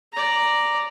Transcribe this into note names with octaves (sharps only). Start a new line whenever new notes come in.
D5 A#5